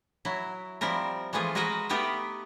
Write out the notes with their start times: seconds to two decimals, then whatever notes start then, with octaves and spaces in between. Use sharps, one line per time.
0.25 F#3 E4
0.81 F3 G3 C4 E4 A#4
1.33 E3 F3 G#3 A3 F4 G#4
1.55 G#3 F#4 A#4 B4 D#5 A#5
1.89 A3 B3 D#4 G4 A#4 B4